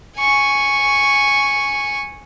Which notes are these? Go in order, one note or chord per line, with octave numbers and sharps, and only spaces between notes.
G#5 C#6